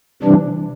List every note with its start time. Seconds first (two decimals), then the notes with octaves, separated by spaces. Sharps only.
0.22 C3 E3 G3 D4